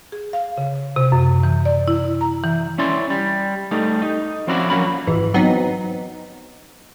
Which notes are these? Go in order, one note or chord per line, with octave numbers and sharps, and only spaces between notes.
G#4
F5
C#3
C3
F#2
E3
D5
E4
A#5
E3
C#4 E4 D5 C6
G3
G3 A3 D#4
D#4
F3 C4 C#4 E4 F#4 D5
F3 F#3 A#3 C#4 B5
G#1 E3
F#3 B3 C4 D#4